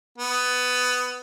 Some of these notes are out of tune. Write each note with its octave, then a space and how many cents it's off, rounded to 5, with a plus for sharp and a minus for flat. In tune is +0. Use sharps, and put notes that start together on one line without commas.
B3 +15